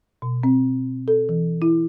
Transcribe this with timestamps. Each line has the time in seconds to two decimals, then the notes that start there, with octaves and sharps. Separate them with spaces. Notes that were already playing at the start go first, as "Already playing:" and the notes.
0.22 B2
0.43 C4
1.08 A4
1.29 E3
1.62 E4